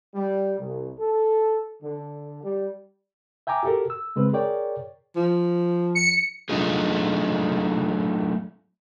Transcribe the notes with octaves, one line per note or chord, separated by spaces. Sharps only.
G3
C2
A4
D3
G3
E5 G5 G#5 A#5 D6
F#4 G4 A4 A#4
E6
C#3 G#3 C4 B4
G#4 A#4 C#5 D5 G5
F3
C#7
F#3 A3 D4 D#4 F4 G#4